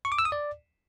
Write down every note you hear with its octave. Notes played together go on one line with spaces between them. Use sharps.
C#6
D6
E6
D#6
D5